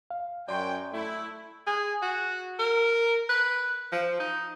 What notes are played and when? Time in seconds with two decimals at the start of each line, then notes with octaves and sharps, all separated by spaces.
0.10 F5
0.48 F#2 D5 G5 C6 C#6
0.93 A3 E4
1.67 G#4
2.02 F#4
2.59 A#4
3.29 B4
3.92 F3
4.20 D#4